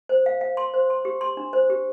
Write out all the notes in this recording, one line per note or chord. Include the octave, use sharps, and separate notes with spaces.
C5
F5
F5
C6
C5
C6
G4
C6
D4
C5
G4